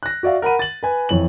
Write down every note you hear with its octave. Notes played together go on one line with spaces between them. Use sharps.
F#6 A#6
F#4 D5 E5 F5
A#4 F#5 B5 D#7
A6 F#7
B4 G#5
F2 E3 C#5 F#7